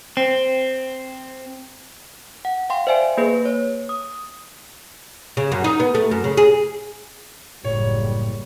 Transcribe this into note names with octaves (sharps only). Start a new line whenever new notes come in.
C4
F#5
F5 G5 C6
C5 D5 E5 G#5 D7
A#3 G#4 B4
C#5
D#6
C#3
F#2
D#4
B3
A3
F#2
C#3
G#4
F#1 A2 G3 C#5